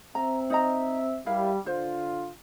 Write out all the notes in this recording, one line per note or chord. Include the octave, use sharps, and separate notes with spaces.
C4 E5 A#5
D#4 D#5 A#5
G3 E4 A#4 F5
D3 F4 C5